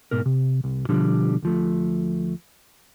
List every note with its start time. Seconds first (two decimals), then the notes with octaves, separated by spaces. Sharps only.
0.11 G#2 B2 A#4
0.26 C3
0.64 C2
0.89 B2 D3 F3 G3
1.43 D2 F3 A3